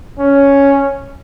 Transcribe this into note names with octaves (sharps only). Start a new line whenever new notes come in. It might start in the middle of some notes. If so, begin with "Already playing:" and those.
C#4